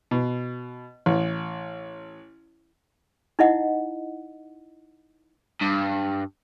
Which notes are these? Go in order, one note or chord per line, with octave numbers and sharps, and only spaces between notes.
B2
A1
D#4 E4 D#5 F#5
G2